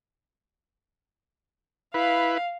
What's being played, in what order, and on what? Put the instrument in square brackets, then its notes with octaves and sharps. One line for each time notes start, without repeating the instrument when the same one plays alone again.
[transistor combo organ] E4 B4 [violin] F5